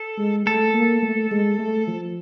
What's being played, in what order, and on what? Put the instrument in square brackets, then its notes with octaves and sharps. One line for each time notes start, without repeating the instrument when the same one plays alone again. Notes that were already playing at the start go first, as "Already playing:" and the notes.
Already playing: [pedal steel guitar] A4
[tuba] G#3
[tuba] A3 [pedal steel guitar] A4
[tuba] A#3
A3
G#3
A3
F3